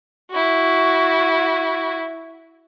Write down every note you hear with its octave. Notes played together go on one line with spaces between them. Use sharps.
E4 F#4